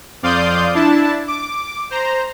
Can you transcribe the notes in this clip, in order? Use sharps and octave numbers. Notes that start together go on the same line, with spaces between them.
F2 D5 F5 C6 D#6 G6
D4 E4 A5
D6
C5 A#5